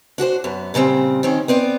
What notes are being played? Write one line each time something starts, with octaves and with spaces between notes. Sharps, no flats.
D4 F#4 G4 C5
F#2 B3
A#2 C#3 G3 C4
D#3 C4 C#4
B3 C4 D5